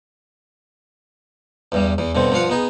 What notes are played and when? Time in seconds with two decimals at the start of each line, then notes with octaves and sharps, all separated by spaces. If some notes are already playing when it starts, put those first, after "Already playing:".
1.72 E2 G2 G3
1.98 E2 E3
2.15 G2 B2 D3 C4
2.32 G2 F3 F4 F5 F#5
2.50 B3 D#4 G#4